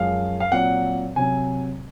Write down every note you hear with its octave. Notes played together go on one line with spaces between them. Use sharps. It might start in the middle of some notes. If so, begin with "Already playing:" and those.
Already playing: F#2 F3 G#3 C#4 F5
F5
A#2 F#3 C4 F#5
C3 F#3 C4 G#5